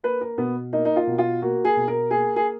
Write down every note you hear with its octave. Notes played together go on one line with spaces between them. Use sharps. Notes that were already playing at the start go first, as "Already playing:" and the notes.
A#3 B4
A#4
B2 B3
A#3 D#4
D#4
F4
B2
F4
A#3 F#4
G#4
B2
A#4
A#3 G#4
G#4